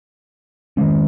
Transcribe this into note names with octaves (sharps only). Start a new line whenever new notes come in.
D#3 G#3 C#4